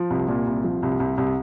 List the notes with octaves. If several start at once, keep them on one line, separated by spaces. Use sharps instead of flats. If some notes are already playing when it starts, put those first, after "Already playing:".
Already playing: F3
C2
A#2
C2
F3
C2
C2
C2